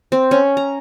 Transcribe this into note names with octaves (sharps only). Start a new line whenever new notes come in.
C4
C#4
A#5